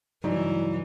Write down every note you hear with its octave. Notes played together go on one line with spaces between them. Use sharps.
C#2 G2 E3 F#3 D#4